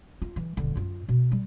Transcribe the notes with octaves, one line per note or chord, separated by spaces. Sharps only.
F4
E3
D#1 D3
F#2 F4
B2
G3